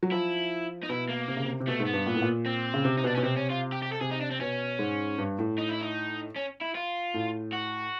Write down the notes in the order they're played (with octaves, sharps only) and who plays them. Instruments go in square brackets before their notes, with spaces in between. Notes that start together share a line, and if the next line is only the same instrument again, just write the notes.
[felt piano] F#3
[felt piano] F3 [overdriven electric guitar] E4
[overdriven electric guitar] D#4
[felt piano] B2 [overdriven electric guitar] E4
[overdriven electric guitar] A#3
[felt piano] C3
C#3
C3
C3
[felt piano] B2 [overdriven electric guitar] A3
[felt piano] G#2
[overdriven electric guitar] B3
[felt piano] G2
A#2
A2
A#2
[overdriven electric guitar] C4
[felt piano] C#3
C3
[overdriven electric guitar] D#4
[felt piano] B2 [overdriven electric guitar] D4
[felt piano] B2 [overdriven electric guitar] C#4
[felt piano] C3 [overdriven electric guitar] C4
[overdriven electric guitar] C#4
F4
G4
G4
A4
[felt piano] C3 [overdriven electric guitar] G#4
[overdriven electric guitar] D#4
D4
C4
[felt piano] B2 [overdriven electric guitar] C#4
[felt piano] G#2
G2
A2
[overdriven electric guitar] D#4
E4
D#4
C#4
E4
F4
[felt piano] A2
[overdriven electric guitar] F#4